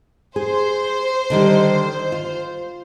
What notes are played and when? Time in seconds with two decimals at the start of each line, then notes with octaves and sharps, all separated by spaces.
0.36 G#4 C5
1.30 D3 D#3 G3
2.12 F4